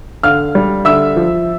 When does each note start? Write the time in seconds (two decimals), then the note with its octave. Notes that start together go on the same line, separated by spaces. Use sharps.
0.23 D3 F5 F6
0.55 G3
0.85 D3 E5 E6
1.16 F3